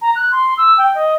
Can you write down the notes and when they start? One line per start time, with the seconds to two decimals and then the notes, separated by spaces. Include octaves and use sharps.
0.01 A#5
0.15 F#6
0.31 C6
0.57 E6
0.78 G5
0.95 D#5